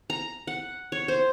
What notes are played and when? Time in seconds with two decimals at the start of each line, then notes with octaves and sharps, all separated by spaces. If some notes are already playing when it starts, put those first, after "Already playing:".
0.10 A#5
0.47 F#5
0.92 C#5
1.08 C5